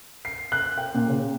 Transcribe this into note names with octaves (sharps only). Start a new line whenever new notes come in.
C7
F#6
G5
A#2
C#3